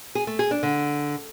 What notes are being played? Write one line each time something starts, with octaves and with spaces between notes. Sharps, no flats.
G#4
A3
G#4
D4
D3